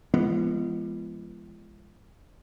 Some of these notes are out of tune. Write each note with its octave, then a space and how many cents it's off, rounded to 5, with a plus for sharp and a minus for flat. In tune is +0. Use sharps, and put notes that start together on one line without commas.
F3 -40 G#3 +0 B3 -5